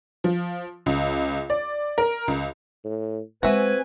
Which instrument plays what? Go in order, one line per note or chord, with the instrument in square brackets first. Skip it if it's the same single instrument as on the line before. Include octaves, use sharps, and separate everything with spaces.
[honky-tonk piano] F3
C#2
D5
A#4
C#2
[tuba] A2
[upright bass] G#3 [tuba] C4 [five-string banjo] F#4 E5 [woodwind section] B4 G#5